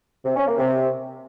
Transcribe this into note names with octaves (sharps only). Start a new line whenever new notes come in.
C3
C#4
A#3
C3